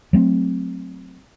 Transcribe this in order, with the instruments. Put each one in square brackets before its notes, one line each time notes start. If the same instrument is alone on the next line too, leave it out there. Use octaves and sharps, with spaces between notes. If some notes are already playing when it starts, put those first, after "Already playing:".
[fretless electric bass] F#3 A3 C4